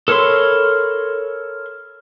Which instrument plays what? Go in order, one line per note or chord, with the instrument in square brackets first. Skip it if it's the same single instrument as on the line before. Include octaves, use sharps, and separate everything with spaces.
[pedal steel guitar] A4 A#4 C#5 B5 C6